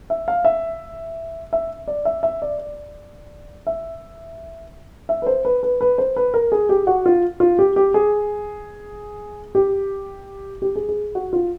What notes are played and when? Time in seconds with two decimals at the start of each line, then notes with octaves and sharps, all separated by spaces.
0.10 E5
0.28 F5
0.45 E5
1.53 E5
1.88 D5
2.05 E5
2.23 E5
2.42 D5
2.59 D5
3.67 E5
5.09 E5
5.22 B4
5.27 C5
5.45 B4
5.63 B4
5.81 B4
5.98 C5
6.16 B4
6.34 A#4
6.52 G#4
6.69 G4
6.87 F#4
7.06 F4
7.40 F4
7.59 G4
7.76 G4
7.94 G#4
9.55 G4
10.62 G4
10.76 G#4
10.89 G#4
11.15 F#4
11.33 F4